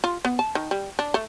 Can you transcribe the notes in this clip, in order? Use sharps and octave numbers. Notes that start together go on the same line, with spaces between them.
F4
B3
A5
D#3
G3
D4
A3